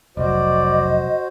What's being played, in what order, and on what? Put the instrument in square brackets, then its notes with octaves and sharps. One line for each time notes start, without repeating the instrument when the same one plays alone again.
[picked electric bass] F1 B1 [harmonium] F#4 C5 [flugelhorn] D5 [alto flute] D#5